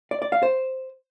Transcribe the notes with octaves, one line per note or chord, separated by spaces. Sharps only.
D5
D5
F5
C5